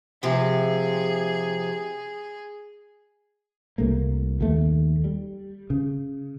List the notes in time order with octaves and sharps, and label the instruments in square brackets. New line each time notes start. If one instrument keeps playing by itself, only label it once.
[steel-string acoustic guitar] A2 C3 F3 [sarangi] G#4
[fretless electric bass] C2 A3 A#3
D#2 A3
G3
C#3